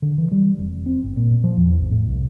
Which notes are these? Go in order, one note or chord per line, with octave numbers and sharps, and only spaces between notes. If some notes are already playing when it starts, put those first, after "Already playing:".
D3
E3
G3
F1
C4
G1
A#2
F3
E2
G#1
A2
C2